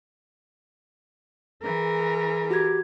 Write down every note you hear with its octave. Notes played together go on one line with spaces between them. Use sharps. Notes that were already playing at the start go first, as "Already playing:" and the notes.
E3 G#4 A#4
F#4 G4 G#6